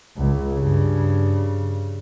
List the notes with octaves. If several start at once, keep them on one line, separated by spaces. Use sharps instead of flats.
C#2
G2 C#3